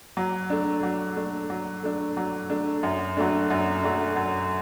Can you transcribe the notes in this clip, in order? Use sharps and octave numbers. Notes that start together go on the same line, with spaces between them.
F#3
A3 D4
F#3
A3 D4
F#3
A3 D4
F#3
A3 D4
F#2
F#3 A3 D4
F#2
F#3 A3 D4
F#2